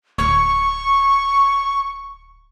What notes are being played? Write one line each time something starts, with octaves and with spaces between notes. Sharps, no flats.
D1 C#6